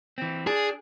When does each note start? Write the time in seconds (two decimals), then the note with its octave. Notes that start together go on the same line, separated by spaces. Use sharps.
0.18 E3 C4
0.47 D4 G#4